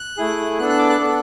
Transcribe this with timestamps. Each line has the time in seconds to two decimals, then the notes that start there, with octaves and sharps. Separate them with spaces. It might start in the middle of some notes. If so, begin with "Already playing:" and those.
Already playing: F#6
0.17 A3 E4 G#4
0.59 B3 D4 A4 F#6
0.69 F#6
0.79 D6
0.89 F#6
1.00 B3 D4 A4